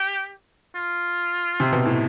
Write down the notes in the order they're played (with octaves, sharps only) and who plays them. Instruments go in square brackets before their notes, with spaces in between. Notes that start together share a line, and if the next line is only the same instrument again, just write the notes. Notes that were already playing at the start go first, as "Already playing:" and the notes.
Already playing: [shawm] G4
F4
[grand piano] C3
B2
A2